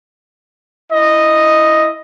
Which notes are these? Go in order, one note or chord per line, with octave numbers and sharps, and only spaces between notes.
E4 D#5